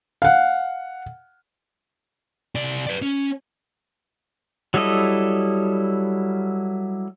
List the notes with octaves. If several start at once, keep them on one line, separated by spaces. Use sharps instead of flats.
F5 F#5
C3 D5
B4 D5
C#4
F#3 G3 E4 A4 D#5